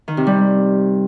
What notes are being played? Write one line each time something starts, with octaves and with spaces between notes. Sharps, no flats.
D#3
C3
G3